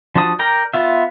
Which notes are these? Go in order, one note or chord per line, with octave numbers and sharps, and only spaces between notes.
F3 D4 F#4 A5 D#6
A#4 D5 G5 A#5
B3 F4 E5